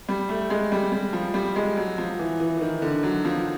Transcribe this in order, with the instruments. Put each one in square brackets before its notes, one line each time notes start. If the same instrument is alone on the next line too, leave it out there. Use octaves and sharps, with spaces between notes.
[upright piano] G3
A3
G#3
G3
G3
F3
G3
G#3
F#3
F3
E3
E3
E3
D#3
D3
F#3
F3